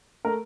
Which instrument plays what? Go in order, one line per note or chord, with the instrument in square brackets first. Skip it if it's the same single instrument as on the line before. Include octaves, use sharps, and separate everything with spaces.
[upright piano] A3 A#4